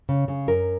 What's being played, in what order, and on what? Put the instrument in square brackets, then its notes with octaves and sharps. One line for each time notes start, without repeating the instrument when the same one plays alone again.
[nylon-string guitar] C#3
C#3
F#2 A#4